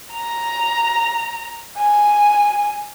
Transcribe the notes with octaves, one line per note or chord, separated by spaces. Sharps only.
A#5
G#5